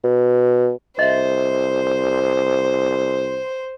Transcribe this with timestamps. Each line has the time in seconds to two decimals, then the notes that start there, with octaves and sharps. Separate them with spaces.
0.04 B2
0.99 C2 C5 D#5 E5